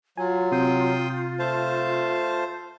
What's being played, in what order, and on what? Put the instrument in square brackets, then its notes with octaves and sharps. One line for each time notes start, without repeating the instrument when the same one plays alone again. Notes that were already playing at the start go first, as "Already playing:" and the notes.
[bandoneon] F#3 [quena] F4 [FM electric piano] G#5
[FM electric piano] C3 [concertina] G5 C6 D#6
[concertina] A3 F5 A5 [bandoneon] C5